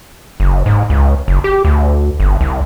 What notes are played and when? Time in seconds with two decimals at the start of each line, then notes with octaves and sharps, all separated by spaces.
0.40 F#1
0.66 G#2
0.90 C#2
1.28 F#1
1.44 G4
1.65 D2
2.20 G1
2.41 C2